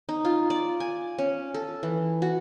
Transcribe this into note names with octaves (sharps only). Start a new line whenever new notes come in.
D#4
F4
D5
G#5
C#4
A4
E3
F#4